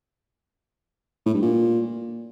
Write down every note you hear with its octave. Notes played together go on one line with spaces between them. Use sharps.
A2
G2
A#2